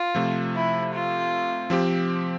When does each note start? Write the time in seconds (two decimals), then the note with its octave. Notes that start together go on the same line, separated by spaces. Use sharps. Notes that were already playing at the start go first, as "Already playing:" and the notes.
Already playing: F4
0.15 C3 F3 A3
0.54 E4
0.93 F4
1.70 F3 C4 G4